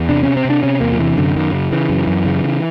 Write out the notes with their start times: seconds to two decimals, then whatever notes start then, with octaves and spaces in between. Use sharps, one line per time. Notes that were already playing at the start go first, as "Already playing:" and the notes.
Already playing: E2
0.09 C3 D4
0.23 C3 C#4
0.37 C4
0.45 C3 D4
0.63 C3 C#4
0.81 E2 A#3
0.93 F3
0.99 C3 E3
1.17 F#2 D3
1.36 F#2 D#3
1.53 C#3
1.71 C#3 E3
1.89 F#2
2.07 F#2
2.25 C#3
2.44 C#3